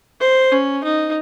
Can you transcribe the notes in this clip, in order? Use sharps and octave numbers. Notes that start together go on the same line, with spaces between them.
C5
C#4
D#4